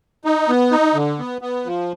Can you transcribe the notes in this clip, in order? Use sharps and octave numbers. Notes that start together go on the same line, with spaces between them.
D#4
B3
D#4
D3
B3
B3
F3